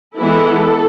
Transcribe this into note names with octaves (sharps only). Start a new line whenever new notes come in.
E3 G#3 B3 E4 A4